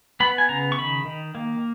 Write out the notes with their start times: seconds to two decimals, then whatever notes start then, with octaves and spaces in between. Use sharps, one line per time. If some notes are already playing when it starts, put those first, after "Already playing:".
0.20 B3 B5
0.38 G#5
0.49 C#3 A#5
0.72 C#6
0.78 D#3 B5
1.06 D#3
1.35 A#3